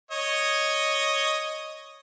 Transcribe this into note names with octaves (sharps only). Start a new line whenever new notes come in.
C#5 D#5